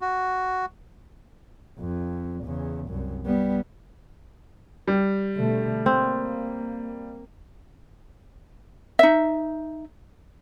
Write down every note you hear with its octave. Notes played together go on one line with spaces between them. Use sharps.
F#4
F2
E2 C#3
C2 F#2
G3 B3
G3
B2 D3 A3
A#3 C4
D#4 E5